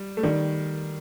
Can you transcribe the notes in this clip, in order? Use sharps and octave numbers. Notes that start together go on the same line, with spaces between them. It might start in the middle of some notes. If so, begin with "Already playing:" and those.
Already playing: G3
A3
D#3 G3